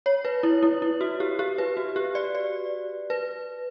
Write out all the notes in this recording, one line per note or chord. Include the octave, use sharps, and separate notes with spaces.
C#5
B4
E4
E4
E4
F#4
G4
G4
B4
F#4
G4
D5
D5
B4